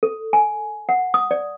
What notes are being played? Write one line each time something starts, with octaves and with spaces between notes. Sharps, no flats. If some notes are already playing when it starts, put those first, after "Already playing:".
A4
G#5
F#5
D#6
D5